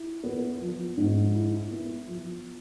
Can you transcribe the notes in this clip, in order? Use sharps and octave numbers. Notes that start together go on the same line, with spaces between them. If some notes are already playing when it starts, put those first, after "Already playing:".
Already playing: E4
B3
F3
G#2
E4
B3
F3